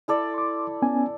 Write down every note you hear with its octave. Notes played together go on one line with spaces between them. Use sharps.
E4 A4 D5
C6 D6
B3 C#4 G#5